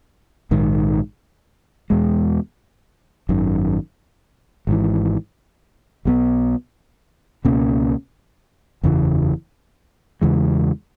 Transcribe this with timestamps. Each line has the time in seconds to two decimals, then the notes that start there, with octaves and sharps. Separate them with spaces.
0.51 A#1 G#2 D#3
1.90 E2 B2 G#3
3.29 G#1 F#2 D#3
4.67 G#1 G#2 E3
6.05 B1 B2 F#3 B3
7.45 C#2 B2 A#3 C#4
8.83 F#1 E2 C#3 E3
10.22 E2 C#3 E3 G#3